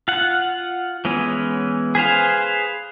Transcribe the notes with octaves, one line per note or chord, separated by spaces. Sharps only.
F4 F#5
E3 G#3 B3 C#4
G#4 B4 C5 F5